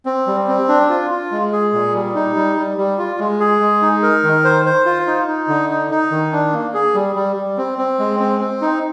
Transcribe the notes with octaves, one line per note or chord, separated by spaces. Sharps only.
C4
G3
C4
D4
F4
F4
G#3
G#4
A#2
G3
D#4
G3
G3
G3
F4
G#3
G#4
G#3
D#4
A#4
D#3
C5
C5
F4
D#4
D#4
D3
D#4
D#4
D#3
D4
A#3
G#4
G3
G3
G3
C4
C4
G#3
C4
C4
D#4